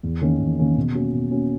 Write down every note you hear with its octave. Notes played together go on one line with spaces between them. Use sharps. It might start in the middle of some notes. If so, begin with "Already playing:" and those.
E2
D#3 A#3 C#4
E2
D#3 A#3 C#4
B2
A#3 C#4 F#4
B2
A#3 C#4 F#4